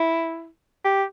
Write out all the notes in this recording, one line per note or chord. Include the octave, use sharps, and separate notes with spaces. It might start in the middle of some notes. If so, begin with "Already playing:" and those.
Already playing: E4
G4